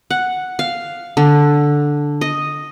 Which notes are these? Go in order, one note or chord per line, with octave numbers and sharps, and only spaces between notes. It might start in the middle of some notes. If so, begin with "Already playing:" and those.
F#5
F5
D3
D#5